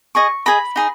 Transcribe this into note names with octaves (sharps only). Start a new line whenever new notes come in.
G#4 D#5 C#6
G#4 D#5 B5
D#4 G#4